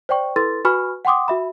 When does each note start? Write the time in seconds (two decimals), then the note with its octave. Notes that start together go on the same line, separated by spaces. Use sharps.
0.09 C5 D5 G5 C#6
0.36 E4 A4 B4 C6 A6
0.65 F#4 B4 G#5 B5 C#6 F6
1.05 F#5 G5 C6 D6 D#6
1.28 F#4 E5 B5